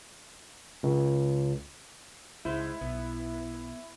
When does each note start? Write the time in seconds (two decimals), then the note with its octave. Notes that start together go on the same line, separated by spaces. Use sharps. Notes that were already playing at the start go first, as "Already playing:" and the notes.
0.83 C#2
2.45 C#2 G#3 D#4 E4 C5
2.81 B1 B3